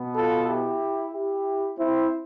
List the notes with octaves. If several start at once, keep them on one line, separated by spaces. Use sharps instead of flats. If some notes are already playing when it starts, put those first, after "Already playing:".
Already playing: B2 B3
F4 A4
E4 G4
E4 G4
C4 E4